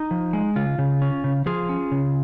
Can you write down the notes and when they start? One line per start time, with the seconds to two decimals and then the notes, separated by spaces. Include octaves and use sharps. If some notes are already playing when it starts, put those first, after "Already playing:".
Already playing: D#4
0.11 F3
0.33 G#3
0.56 C#3 F4
0.79 C#3
1.02 C#4
1.24 C#3
1.46 F3 F4 G#4
1.69 C#4
1.92 C#3